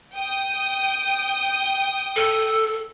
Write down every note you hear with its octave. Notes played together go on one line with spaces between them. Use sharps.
G5 D#6
A4